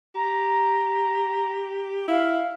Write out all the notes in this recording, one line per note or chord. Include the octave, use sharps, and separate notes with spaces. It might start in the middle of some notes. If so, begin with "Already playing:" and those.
G4 A#5
E4 F5